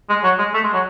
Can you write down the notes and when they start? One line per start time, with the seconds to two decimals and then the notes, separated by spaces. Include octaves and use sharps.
0.09 G#3
0.24 F#3
0.38 G#3
0.54 A3
0.64 G#3
0.73 F#3